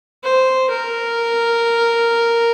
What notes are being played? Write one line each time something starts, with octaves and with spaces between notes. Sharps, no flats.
C5
A#4